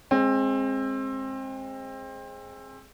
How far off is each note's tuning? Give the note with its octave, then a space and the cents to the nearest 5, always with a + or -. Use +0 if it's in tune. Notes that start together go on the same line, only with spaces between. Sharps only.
G#3 +0 C4 +25